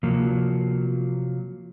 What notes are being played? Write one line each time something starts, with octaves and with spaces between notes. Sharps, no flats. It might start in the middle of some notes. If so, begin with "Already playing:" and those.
C3 F3 F#3 A#3